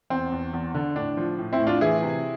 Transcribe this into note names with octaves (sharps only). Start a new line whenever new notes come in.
E2 C4
E2
E2
D3
A2 D4
F3
A2
C4 E4
A2
D4 F4
E3 E4 G#4
C3